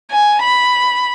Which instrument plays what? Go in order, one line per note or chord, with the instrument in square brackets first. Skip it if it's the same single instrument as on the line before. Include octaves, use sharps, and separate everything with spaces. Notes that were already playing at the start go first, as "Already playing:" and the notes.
[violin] G#5
B5